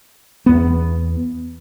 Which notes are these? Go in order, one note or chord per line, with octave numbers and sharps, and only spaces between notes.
E2 B3